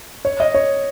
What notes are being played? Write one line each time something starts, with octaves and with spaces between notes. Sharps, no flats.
C#5
D#5
C#5